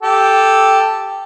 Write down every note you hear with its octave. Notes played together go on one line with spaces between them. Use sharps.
G4 A4